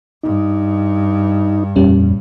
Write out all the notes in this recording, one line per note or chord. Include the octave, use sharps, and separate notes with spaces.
G2 D#4
F2 A#2 G3 C#4